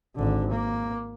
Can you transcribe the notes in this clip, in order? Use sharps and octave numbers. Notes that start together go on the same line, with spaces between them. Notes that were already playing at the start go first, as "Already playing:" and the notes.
G#1 D3
A#3